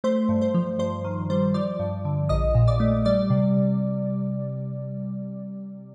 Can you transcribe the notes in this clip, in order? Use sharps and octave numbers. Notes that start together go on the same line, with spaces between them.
A3 C5 C6
G2
C5 C6
F3
G2 C5 C6
D#3
G3 C5 C6
F3 D5 D6
G2
D3
A#1 D#5 D#6
A#2
D5 D6
A3
G3 D5 D6
C3